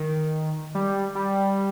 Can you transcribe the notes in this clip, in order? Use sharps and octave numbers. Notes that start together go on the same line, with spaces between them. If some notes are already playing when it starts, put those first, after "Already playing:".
Already playing: D#3
G3
G3